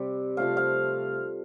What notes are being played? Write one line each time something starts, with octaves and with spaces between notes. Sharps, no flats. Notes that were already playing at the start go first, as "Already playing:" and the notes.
Already playing: C3 G3
C3 F3 A3 F5
F5